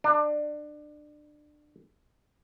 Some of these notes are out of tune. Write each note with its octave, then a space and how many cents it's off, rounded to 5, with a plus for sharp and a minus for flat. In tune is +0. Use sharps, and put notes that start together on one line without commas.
D4 +25